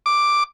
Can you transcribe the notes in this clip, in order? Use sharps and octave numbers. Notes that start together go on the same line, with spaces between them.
D6